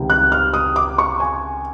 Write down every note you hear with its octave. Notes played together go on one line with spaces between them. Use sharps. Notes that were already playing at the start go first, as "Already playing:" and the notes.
Already playing: C#2 C3 D#3 G3
F#6
F6
D#6
D6
C#6
G#5